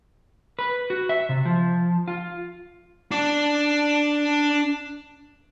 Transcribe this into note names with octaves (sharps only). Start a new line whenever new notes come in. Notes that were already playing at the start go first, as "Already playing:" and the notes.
B4
F#4
E5
C3
F3
F4
D4 D5